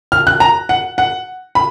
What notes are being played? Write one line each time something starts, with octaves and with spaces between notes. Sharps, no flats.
F6
F#6
A#5
F#5
F#5
B5